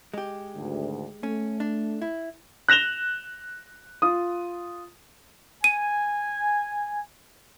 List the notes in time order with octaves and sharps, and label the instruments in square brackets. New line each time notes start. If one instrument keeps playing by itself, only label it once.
[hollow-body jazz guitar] G#3 G4
[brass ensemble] G#1 D2
[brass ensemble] A3 [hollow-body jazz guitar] C#4
[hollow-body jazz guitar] D4
E4
[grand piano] F#6 A#6 E7 F7 G7
F4 D#6
[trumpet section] G#5 [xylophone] D#7